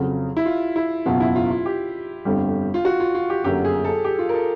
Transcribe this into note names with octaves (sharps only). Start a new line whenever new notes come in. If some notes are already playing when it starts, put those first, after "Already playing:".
Already playing: F2 C#3 F#3
E4
F4
E4
F#1 E2 B2 F#3 F4
E4
F4
F4
G4
G1 F2 D3 G3
F4
F#4
F4
F4
G4
G1 F#2 D3 F#3 A#3 G4
G#4
A4
G4
F4
A#4
A4